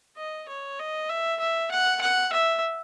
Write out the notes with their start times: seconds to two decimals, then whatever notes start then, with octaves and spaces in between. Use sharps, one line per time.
0.17 D#5
0.49 C#5
0.79 D#5
1.10 E5
1.40 E5
1.71 F#5
2.01 F#5
2.33 E5